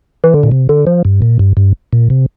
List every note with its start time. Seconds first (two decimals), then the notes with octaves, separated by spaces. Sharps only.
0.24 E3
0.34 D3
0.43 A#2
0.51 C3
0.69 D3
0.87 F3
1.05 G2
1.22 A#2
1.39 G2
1.57 G2
1.93 A#2
2.10 C3